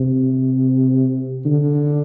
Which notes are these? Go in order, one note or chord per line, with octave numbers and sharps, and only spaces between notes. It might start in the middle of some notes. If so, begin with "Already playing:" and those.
Already playing: C3
D3